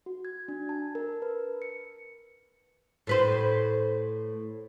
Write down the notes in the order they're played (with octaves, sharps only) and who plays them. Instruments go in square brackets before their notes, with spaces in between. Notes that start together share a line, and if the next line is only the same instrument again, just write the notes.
[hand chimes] F#4
G#6
D4
A5
A#4
B4
C#7
[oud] A2 B4 C5